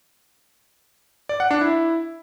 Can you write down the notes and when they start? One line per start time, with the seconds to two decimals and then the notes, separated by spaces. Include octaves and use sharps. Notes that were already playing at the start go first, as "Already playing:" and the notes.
1.29 D5
1.40 F#5
1.51 D4
1.61 E4